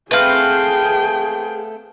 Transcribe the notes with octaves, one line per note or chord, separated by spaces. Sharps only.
A3 B3 C4 G#4 B4 F5 G5